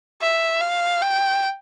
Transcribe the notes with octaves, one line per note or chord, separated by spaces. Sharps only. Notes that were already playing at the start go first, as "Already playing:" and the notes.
E5
F5
G5